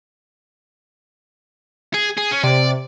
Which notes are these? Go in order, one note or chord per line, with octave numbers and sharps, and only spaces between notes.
G#4
G#4
C#4
C3 D5